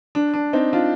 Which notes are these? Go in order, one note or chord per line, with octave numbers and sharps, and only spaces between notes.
D4
D4
C4 D#4
D4 F4